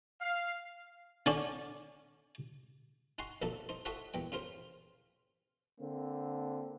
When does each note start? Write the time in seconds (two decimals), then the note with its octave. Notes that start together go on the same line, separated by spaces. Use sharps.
0.21 F5
1.26 D3 C#4 D4
3.18 D#4 F#5 G#5 A#5 C6 C#6
3.42 A#1 F2 D3 D#4 A4 D5
3.69 D#4 C5
3.85 F4 A4 C#5 D#5 E5 F#5
4.14 E2 A#2 G5
4.32 C#3 F4 A#4 C5
5.80 D3 A#3 C4